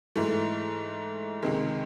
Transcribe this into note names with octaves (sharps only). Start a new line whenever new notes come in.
G#2 E3 A3
C#2 C3 D#3 G#3